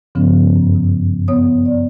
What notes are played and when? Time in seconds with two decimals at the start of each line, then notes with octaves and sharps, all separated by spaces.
0.15 G2 C#3 F3 B3 C#4
0.56 F#2
0.75 B2
1.28 B3 C#5 D#6
1.65 D5